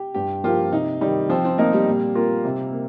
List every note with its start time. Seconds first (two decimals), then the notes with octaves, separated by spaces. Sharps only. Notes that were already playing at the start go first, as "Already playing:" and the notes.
Already playing: G4
0.14 G2 G4
0.43 F3 A#3 F4 G4 A#4
0.72 C3 D#4
1.01 D#3 G3 D#4
1.29 F3 C4
1.45 C4
1.58 A#3 D#4 A#4
1.73 G3
1.88 A#2
2.15 A#3 F4 A#4
2.44 C3
2.72 A#3